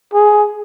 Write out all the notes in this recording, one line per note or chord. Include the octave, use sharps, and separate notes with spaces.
G#4